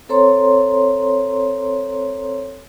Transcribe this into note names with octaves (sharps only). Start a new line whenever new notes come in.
C4 A4 C5 C#5 A#5 C6